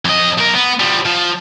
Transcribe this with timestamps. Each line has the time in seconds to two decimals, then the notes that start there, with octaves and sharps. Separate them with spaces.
0.05 F2 D#5
0.38 B1 A#4
0.55 B3
0.80 F3 G3
1.06 F3